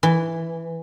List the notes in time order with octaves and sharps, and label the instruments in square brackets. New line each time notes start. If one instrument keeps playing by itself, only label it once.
[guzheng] E3